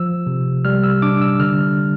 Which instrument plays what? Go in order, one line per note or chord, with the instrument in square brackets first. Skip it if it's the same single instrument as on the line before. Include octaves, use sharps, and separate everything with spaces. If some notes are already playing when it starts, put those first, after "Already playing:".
Already playing: [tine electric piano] F3 E6
C3
G3 F6
E6
D4 D6
E6
D3 F6